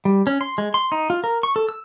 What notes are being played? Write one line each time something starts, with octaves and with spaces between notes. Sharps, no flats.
G3
C#4
C6
G#3
C6
D#4
F4
A#4
C#6
A4
E6